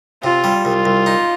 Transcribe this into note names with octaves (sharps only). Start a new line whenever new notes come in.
C3 F4
G3
C2 F4
C2
D#4